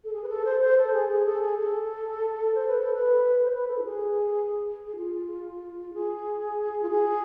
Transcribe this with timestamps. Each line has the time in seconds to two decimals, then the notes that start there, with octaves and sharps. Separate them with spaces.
0.04 A4
0.13 G#4
0.23 B4
0.29 A4
0.45 C5
0.61 C5
0.77 A4
0.93 G#4
1.09 G#4
1.25 A4
1.42 G#4
1.58 A4
2.54 C5
2.68 B4
2.80 A4
2.94 B4
3.45 C5
3.52 B4
3.68 A4
3.78 F4
3.83 G#4
4.86 G#4
4.96 F4
5.93 G#4
6.83 F4
6.90 G#4